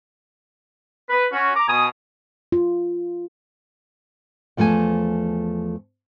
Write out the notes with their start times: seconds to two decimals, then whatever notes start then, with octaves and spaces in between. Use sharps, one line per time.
1.09 B4
1.33 C#4 F#4
1.56 A#5 D6
1.68 B2 G#5 D#6
2.52 F4
4.57 E2 F3 A3 G5 G#5